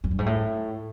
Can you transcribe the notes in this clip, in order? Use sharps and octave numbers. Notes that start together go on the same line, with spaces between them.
F#2
G2
G#2
A2